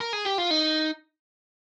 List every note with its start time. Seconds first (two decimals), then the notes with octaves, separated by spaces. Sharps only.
0.00 A#4
0.13 G#4
0.25 G4
0.38 F4
0.51 D#4